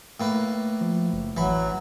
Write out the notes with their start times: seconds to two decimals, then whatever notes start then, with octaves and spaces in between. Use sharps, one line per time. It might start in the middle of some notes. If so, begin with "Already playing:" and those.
0.20 A2 A#3 B4
0.81 F3
1.13 F#1
1.37 A1 E3 F#3 B5